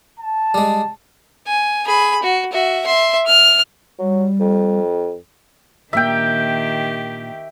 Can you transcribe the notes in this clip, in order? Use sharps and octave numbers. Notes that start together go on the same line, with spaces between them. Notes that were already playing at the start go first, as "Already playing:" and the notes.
A5
G3 G#3
G#5
G#4 B5
F#4
F#4 E5
E5 C6
F6
F#3 G3
F2
A#2 D#3 A#3 D4 G4 E5 G5